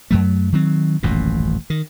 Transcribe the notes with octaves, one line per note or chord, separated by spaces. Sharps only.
F#2 F#3 A3
D#3 F#3 C4
D#1 A1 F#2 A#2
D#3